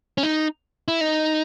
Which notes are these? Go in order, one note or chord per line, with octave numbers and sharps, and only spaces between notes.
C#4
D#4
E4
D#4